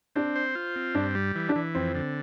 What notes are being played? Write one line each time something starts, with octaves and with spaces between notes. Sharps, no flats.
C4 D4
C5
F4
C4
G2 D4
G3
E3
D4
E3
F2 C4
D3